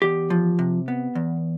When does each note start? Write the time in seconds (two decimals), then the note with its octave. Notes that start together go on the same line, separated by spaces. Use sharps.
0.02 E2 G4
0.30 F3
0.59 C3
0.88 B3
1.15 E2